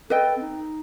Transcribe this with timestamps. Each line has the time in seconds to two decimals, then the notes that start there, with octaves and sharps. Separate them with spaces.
0.10 A4 B4 D#5 G5
0.26 A4
0.37 C4
0.42 D#4